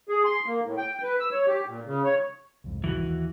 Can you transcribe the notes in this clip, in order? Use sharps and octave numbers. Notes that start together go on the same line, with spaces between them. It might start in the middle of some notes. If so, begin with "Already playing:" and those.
G#4
C6
A#3
A2
G5
B4
E6
C#5
G4
A#2
C#3
C#5
C2 F2 G#2
E3 F#4
D#2